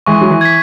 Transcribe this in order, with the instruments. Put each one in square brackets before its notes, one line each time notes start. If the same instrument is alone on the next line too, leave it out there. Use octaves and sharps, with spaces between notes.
[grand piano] E3 G#3 [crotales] C#6
[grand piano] F#3
E3
[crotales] G#6 B6